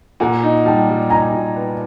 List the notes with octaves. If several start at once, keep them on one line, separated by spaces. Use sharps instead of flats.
A#2 F#5 G#5
D#4
G3 G5 A5
G3
D#4 G#5 A#5
A#2
B3